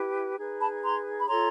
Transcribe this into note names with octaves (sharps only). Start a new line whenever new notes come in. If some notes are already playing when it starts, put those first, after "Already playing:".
Already playing: E4 G4 B4
D#4 G#4 B4
A5 B5
A#5 C6
B5
F4 A4 C#5 A#5 C6